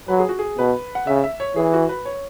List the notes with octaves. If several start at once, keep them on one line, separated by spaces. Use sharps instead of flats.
F#3 B4
G#4
F#4
G#4
B2 B4
F#5
C#3 E5
E5
C#5
E3 G#4
F#4
B4
C#5